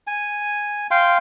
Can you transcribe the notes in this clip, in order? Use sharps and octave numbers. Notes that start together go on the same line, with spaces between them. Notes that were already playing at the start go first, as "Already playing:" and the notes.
G#5
F5 G5 C6